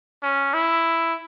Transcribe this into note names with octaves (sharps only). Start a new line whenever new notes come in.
C#4
E4